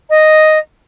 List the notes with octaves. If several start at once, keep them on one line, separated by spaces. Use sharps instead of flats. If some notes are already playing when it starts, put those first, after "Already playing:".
D#5